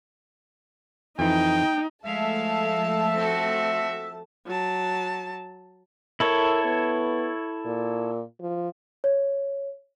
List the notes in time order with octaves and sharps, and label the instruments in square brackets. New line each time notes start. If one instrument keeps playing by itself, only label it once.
[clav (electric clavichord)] F2 E3 [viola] D#4 [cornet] G5
[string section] F3 A3 A5 [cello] G#3 F5 [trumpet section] E5
[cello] C4 F#4
[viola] F#3 A5
[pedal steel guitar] E4 A4 C#5 [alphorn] A#4
[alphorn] B3
A#2
F3
[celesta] C#5